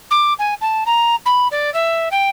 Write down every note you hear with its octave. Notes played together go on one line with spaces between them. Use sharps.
D6
G#5
A5
A#5
B5
D5
E5
G5